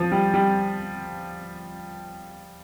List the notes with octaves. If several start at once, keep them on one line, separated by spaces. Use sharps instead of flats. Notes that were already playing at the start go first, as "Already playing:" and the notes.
Already playing: F3
G3
G3